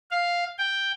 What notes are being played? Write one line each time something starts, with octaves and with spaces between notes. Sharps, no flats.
F5
G5